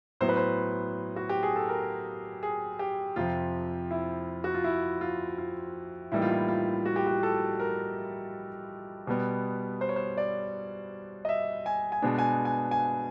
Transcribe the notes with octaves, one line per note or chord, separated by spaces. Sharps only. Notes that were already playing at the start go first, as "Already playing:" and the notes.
A2 F#3 B3 C5
B4
C5
F#4
G4
G#4
A4
A#4
G#4
G4
F2 C3 F3 F4
E4
F#4
F4
E4
F4
F4
A2 E3 G3 A#3 D#4 E4
F4
E4
F4
F#4
G4
F#4
A4
A#4
B2 G3 B3
C5
C#5
C5
D5
D#5
E5
G#5
G#5
B2 G#3 B3 D4
G#5
G#5
G#5